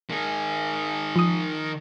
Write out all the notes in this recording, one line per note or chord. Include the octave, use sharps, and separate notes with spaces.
D#3 G#4
F3 D#6